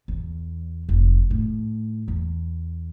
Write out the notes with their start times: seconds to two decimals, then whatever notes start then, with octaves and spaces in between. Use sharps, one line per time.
0.08 E2
0.89 F1
1.30 A2
2.08 E2